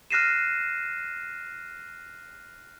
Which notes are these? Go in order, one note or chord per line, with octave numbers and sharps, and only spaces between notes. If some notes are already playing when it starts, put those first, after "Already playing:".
F6 F#6 A#6 C7 D#7 E7